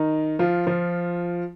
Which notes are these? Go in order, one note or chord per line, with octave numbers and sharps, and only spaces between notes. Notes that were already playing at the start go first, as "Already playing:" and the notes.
Already playing: D#3 D#4
F3 F4
F3 F4